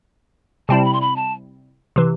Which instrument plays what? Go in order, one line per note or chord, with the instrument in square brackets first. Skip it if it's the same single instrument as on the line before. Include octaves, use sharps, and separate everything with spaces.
[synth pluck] C3 G3 C4 E4 [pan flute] A5
[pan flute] B5
C6
B5
A5
[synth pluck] C3 E3